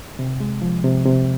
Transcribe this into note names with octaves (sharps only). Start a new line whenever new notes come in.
C3
G#3
F3
C3
C3